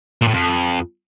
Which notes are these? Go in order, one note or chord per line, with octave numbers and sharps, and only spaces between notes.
A#2
A2
F2